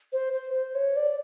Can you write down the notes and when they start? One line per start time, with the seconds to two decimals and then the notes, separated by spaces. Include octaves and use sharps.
0.12 C5
0.33 C5
0.54 C5
0.75 C#5
0.96 D5